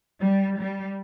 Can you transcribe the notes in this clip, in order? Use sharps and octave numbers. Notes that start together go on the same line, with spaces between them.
G3
G3